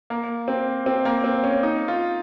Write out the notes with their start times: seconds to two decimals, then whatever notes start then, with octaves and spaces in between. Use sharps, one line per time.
0.10 A#3
0.48 C4
0.86 C4
1.05 A#3
1.24 C4
1.44 C#4
1.63 D#4
1.88 F4